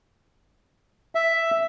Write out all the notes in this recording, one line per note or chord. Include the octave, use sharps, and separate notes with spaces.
E5